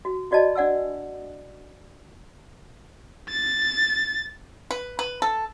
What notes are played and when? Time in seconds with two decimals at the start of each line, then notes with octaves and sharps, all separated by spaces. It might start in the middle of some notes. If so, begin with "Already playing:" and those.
0.05 F#4
0.31 F4 F#4 D5 D#5 A5
0.55 D4 D5 F#5 G#5 E6
3.29 A6
4.71 B4
4.99 B4
5.22 A4